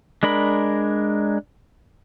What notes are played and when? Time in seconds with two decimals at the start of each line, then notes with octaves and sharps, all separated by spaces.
0.23 G#3 D4 A#4 B5